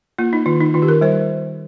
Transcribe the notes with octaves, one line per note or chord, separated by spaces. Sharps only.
A#3 F4
D#4
D#3 F4
D#4
D#3 F4
G4
A#4
G3 C5